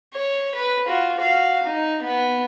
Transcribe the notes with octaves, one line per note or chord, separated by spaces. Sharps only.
C#5
B4
F4 F#4
F#4 F5
D#4
B3